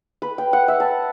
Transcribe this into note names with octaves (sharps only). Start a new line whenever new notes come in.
B4
G5
F#5
E5
A5